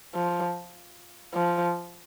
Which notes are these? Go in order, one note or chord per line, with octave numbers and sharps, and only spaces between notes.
F3
F3